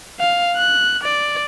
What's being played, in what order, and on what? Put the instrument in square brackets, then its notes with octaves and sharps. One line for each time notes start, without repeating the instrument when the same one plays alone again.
[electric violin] F5
F#6
D5